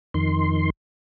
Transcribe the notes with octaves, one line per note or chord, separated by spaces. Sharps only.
F2 D#3 C6